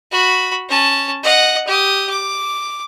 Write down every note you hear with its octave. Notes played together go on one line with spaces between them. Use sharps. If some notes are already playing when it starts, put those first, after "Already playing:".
F#4 B5
C#4 A5
D#5 F#5
G4 D#6
D6